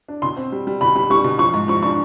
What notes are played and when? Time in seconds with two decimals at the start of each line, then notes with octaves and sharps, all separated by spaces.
0.08 D4
0.22 B2 C6
0.37 C4
0.52 G3
0.67 G3
0.81 B2 B5
0.95 G3 B5
1.10 G3 C#6
1.24 B2
1.39 F3 C#6
1.54 G#2
1.68 F3 C#6
1.83 D4 C#6